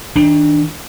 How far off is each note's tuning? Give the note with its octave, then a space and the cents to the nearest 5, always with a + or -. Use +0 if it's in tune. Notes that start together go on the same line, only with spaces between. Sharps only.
D#3 +35 D4 +10